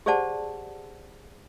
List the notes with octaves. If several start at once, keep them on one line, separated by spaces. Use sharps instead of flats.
G4 G#4 C5 D5 F#5 A5